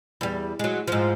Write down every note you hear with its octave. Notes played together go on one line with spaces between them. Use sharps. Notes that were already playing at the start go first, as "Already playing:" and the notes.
E2 G3
F#3 G#3
G#2 F3